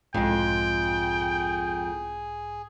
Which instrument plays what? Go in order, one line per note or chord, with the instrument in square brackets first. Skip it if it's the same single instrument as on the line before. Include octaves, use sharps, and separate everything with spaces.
[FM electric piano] B1 G#2 [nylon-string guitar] F2 G#3 [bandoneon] G#4 [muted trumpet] G5